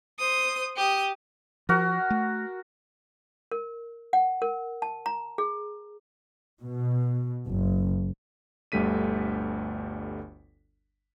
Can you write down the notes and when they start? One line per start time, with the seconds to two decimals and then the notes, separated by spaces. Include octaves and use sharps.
0.19 C5 D#6
0.76 G4 D#6
1.69 F3 F#4 A#4
2.10 A3
3.52 A#4
4.13 F#5
4.42 A#4
4.82 A5
5.06 A#5
5.38 G#4
6.61 B2
7.46 F#1
8.72 G1 D2 G3 A3 B6 D#7